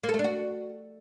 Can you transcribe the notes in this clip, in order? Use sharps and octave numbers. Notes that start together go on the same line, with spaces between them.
A#3
A4
A3
D4
F#4